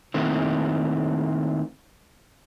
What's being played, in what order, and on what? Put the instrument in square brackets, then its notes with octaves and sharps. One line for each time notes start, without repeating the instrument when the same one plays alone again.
[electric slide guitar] D#3 A3 A#3 C4 E4